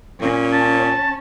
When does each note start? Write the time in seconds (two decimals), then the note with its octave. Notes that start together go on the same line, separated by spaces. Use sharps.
0.21 A#2 C#4
0.53 A5